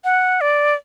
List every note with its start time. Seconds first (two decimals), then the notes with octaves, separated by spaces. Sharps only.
0.04 F#5
0.41 D5